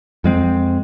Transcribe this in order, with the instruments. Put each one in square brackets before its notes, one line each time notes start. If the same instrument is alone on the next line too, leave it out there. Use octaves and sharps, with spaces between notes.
[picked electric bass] F2 G#3 C4